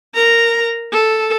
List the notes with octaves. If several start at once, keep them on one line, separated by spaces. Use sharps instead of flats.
A#4 A#5
A4